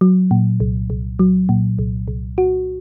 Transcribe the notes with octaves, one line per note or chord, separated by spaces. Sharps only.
F#3
A#2
C2
C2
F#3
A#2
C2
C2
F#4